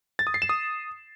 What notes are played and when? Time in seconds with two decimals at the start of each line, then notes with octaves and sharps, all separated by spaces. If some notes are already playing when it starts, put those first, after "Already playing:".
0.19 A6
0.27 D#6
0.34 C7
0.42 E7
0.49 D#6